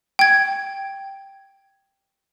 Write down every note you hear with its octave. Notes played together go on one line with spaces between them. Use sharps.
G5 G#6